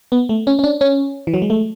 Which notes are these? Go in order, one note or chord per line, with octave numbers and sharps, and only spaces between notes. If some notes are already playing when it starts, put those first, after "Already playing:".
B3
A3
C#4
C#4
D4
C#4
E3
F#3
G#3
A3